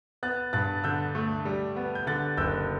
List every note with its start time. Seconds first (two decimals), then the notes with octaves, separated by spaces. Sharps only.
0.23 B3 F#6 A6
0.53 G2 F#6 A6
0.84 D3 E6 G6
1.15 A3
1.45 G3
1.76 B3
1.95 G6
2.07 D3 F#6 A6
2.37 F#1 E6 G6